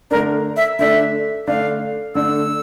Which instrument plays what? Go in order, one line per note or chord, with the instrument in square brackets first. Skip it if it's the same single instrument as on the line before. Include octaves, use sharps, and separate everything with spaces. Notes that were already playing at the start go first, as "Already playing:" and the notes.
[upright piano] D3 A3 D4 [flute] A#4
[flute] E5
[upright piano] D3 A3 D4 [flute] E5
[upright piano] D3 A3 D4 [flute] F5
[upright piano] D3 A3 D4 [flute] E6